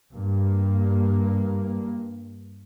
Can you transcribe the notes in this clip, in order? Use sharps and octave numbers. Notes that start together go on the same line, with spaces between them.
G2 A#3